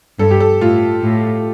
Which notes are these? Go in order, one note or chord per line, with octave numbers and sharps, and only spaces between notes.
G2 A4
G4
A4
A2 F4
A2